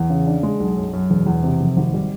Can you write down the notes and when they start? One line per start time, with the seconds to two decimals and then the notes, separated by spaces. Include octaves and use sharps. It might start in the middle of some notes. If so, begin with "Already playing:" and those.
Already playing: E2
0.10 C#3
0.27 D4
0.43 G#3
0.60 B1
0.77 F#2
0.93 F#2
1.10 E1
1.27 E2
1.43 C3
1.60 F1
1.77 G#1
1.94 G3